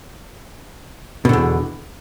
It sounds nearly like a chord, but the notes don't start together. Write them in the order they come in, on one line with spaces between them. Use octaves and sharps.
B2 D3 E2